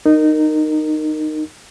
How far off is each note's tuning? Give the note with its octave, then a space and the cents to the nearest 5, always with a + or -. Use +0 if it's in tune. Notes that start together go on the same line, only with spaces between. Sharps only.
D#4 -15 A#4 -10